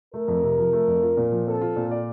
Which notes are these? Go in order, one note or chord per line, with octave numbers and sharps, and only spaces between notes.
A3 A#4
F2
C3
F3
A3
F2
F4
A#2
F3
C4 A4
F4
A#2
D5